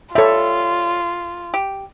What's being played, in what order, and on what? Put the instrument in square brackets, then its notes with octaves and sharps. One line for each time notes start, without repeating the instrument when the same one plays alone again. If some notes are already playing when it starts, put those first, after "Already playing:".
[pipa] G3 C#5 [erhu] F4 [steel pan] A4 E5
[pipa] G4